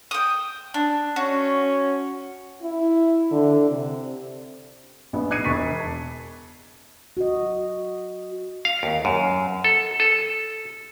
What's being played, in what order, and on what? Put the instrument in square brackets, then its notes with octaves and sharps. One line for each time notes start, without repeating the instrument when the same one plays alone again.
[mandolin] G5 D#6
D4
[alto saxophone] C#4 [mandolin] F#4
[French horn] E4
D3
C3
[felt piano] A#1 B3
D6 F#6 G#6 C7 C#7 D#7
E1 C#6 A6 B6
A5
[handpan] F#4 D#5
[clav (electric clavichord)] F5
D#2
F#2
A4
A4